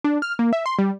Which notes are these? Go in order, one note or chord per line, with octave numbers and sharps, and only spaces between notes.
D4
F6
A#3
E5
C6
G3